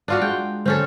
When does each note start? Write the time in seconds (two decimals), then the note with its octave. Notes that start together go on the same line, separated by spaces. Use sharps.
0.08 D4 F4 F#4 E5
0.22 G#3 G5
0.66 D3 C4 C#4 A4